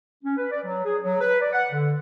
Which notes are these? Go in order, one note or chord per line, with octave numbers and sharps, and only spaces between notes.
C#4
B4
D5
F#3
G#4
F#3
B4
D5
F#5
D3